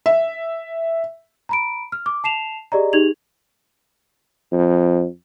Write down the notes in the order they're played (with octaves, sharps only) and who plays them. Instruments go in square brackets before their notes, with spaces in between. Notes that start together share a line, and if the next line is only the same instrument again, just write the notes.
[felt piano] E5
[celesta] A#5 B5 D7
F6
D6
A5 C7 E7 F7
G4 G#4 D5 D#5 A#5
D#4 G4 G#4 G#6 F7 F#7
[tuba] F2